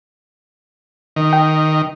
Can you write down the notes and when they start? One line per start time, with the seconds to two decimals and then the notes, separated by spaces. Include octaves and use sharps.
1.16 D#3
1.33 G5